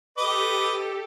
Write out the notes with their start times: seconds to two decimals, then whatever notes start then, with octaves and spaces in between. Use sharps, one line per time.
0.18 G4 A4 B4 D#5 D6